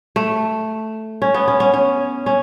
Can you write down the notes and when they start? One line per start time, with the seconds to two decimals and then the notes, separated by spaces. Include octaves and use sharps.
0.16 A3
1.22 C#4
1.34 B3
1.48 C#4
1.60 C#4
1.74 C#4
2.26 C#4